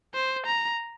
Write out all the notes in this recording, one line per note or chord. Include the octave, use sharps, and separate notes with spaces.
C5
A#5